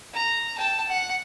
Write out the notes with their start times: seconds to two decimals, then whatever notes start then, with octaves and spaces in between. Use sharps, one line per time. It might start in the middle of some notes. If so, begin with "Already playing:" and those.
0.14 A#5
0.58 G5 A5
0.89 F#5